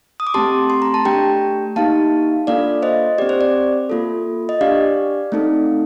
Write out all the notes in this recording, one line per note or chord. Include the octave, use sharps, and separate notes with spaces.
D#6
D6
A3 C4 G4 A5 C6
C6
A#5
A5
A3 D4 G4 G5 A#5
A#3 D#4 G4 F5 A5
A#3 D4 F4 A4 D5 F5
C5 D#5
C4 G4 D5
C5
D5
A#3 F4 A4
D#5
D4 G4 D5 F5
A3 C4 D#4 A4